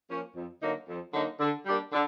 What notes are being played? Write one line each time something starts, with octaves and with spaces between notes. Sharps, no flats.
F3 A#3 C#4
F2
D3 F#3 A#3 D#4
F2
D3 F#3 A#3 D#4
D3
G3 A#3 D4 G4
D3